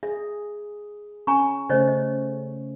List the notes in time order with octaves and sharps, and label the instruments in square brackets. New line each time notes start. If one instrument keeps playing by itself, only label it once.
[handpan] G#4 [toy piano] E5
[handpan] C#4 [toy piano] G#5 A#5 C#6
[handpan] C#3 A3 C#4 [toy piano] C5 C#5 D#5
[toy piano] D#5